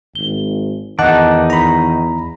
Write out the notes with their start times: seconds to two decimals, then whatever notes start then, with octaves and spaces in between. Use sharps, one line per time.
0.15 G#1 G7
0.99 E2 D#3 D#4 D#5 F#5 A5 D6 F#6
1.50 A#5 B5